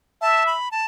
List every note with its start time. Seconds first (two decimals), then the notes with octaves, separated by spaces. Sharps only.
0.21 E5 A5
0.46 B5
0.71 A5